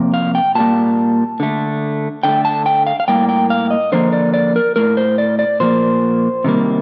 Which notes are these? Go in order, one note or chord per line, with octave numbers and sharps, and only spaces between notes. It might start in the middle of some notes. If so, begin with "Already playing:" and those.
Already playing: C3 F3 A#3
F5
G5
A#2 G3 A#3 A5
D3 A3
D3 A3 G5
A5
G5
F5
F5
A2 G3 A#3 G5
G5
F5
D#5
D3 F3 A#3 C5
D5
D5
A#4
A2 A3 A#4
C5
D5
D5
A#2 F3 A#3 C5
C3 D#3 G3 A#3